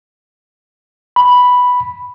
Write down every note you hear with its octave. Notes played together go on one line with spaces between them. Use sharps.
B5